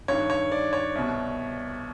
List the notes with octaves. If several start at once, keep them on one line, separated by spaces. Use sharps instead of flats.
G2 D#3 C#5
C#5
D5
C#5
C2 B2